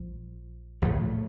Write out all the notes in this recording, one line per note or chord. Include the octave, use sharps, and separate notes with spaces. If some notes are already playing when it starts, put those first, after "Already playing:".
Already playing: A#1 F3
A#1 A2 F3 A3